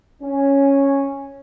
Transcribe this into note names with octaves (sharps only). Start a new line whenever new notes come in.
C#4